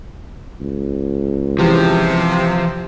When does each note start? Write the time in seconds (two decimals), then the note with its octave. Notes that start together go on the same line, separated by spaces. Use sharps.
0.60 C#2
1.59 C3 E3 F3